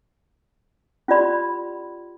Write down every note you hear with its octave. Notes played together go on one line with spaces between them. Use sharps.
C#4 F4 G4 D5 B5 C6